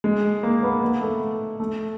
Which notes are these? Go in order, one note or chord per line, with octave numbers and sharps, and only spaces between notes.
G#3
A#3
B3
A#3
A3
A3